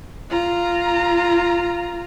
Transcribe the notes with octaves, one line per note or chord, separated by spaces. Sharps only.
F4 A#5